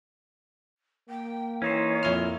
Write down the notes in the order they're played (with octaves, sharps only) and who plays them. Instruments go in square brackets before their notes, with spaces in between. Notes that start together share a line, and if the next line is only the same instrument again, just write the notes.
[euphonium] A#3 [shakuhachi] G5
[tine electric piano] E3 [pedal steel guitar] C#4 D#4 C5 [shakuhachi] C#5
[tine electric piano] F2 E4 F6 [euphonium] A#2